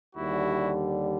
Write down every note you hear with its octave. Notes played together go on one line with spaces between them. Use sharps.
D#2 D3 G3 E4 F#4